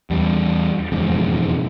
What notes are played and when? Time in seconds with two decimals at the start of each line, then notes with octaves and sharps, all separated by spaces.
0.10 E2 G3
0.92 E1 F2 G#2 C#3